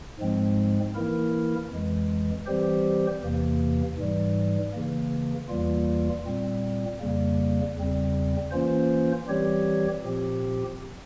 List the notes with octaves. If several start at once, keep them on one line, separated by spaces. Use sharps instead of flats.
G#2 F3 G#3 C4
E3 A#3 E4 A#4
F2 E3 G#3
E3 G3 C4 G4 C5
E2 C3 E3 A#3
G#2 E3 G3
C#3 E3 A#3
E2 E3 G3 A#3 F4
A#2 G3 C4
F2 C#3 G3 A#3
E2 C#3 G3 C4
E3 A#3 C#4 F4 C5
E3 G3 C4 G4 C#5
A#2 F3 C4 G4